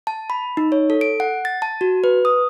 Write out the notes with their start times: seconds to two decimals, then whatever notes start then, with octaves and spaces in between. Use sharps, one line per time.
0.07 A5
0.30 B5
0.57 D#4
0.72 C#5
0.90 A4
1.01 D7
1.20 F#5
1.45 A6
1.62 A5
1.81 F#4
2.04 B4
2.25 D#6